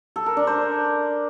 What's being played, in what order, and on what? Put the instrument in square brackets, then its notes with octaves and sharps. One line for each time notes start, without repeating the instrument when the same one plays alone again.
[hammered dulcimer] A4
A#4
D4
C5